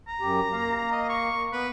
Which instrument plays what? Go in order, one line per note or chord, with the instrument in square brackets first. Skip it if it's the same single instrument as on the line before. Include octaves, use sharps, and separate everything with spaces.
[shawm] A#5
[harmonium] F#2 G4
A#3 F5
[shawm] D#5
C#6
[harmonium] B3 [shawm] B4